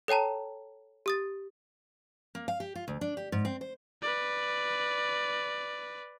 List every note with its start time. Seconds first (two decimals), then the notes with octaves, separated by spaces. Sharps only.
0.08 A4 C#5 G5 A5 A#5
1.06 G4 D#6 A6
2.35 A#3
2.48 F5
2.60 G4
2.75 F4
2.88 D2
3.01 D4
3.17 G4
3.32 G#2
3.45 C4
3.61 C5
4.02 B4 D5